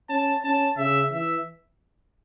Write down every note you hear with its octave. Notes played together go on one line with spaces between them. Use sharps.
C#4 A5
C#4 A5
C#3 E5
E3 E5